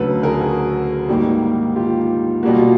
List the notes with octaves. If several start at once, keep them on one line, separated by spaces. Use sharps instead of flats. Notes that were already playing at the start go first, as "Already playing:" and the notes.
Already playing: D2 C#3 F#3 A3 A4 B4
G#4 A#4
F#4 G#4
G#2 D#3 G3 A#3
F4 G4
B2 G3 A#3 F#4
F4